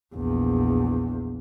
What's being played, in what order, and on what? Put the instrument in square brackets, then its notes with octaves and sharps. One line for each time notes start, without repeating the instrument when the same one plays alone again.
[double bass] A#1 E2